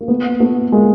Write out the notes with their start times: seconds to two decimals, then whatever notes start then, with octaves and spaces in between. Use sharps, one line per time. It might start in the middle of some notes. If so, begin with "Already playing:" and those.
0.01 A#3
0.08 A3 B3
0.40 A3 B3
0.72 G#3 A#3